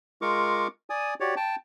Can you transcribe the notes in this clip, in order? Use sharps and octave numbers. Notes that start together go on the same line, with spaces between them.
G#3 F4 A#4 C#6 D6
D5 G#5 D#6
F#4 G4 C#5 D5
G5 A5